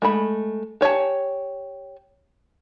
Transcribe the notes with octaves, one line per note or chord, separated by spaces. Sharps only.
G#3 A3 B5
G4 C#5 G#5 A5